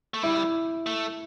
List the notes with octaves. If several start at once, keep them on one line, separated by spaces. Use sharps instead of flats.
A3
G3 E4
A3